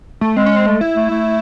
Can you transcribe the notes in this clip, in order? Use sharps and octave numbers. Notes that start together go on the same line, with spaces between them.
A3
G#3 C4
C#4
C4
A3
E4
A3
A3